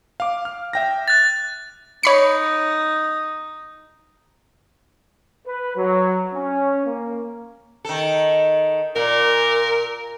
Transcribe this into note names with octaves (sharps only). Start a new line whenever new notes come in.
F5 D6
F6
E5 G5 A#6
F#6 A6
D#4 C#5 B5 C#7
B4
F#3
C#4
A#3
D#3 A4
A#2 A#4